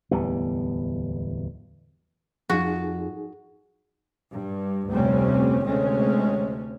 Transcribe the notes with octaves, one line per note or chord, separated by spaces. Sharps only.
D1 E2 G3 B3
F2 D#4 F#4 G#4
G2
F1 D2 C3 G3 C4 C#4
D2 C3 G#3 A3 C4 C#4